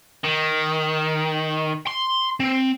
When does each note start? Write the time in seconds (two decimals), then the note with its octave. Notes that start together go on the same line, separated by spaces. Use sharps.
0.24 D#3
1.88 C6
2.40 C4